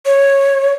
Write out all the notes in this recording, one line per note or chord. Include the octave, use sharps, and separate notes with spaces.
C#5